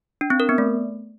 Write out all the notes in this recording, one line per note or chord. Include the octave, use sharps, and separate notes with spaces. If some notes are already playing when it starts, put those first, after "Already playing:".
D4
C4
A#4
B3
A3